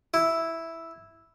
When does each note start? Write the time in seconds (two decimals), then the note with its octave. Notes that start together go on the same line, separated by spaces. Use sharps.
0.14 E4